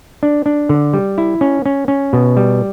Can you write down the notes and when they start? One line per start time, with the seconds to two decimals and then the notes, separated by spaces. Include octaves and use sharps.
0.23 D4
0.46 D4
0.69 D3
0.94 G3
1.18 E4
1.41 C#4
1.66 C#4
1.88 C#4
2.13 B2
2.37 G3